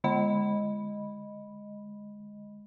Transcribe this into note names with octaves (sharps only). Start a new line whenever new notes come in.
D3 G#3 D#5 B5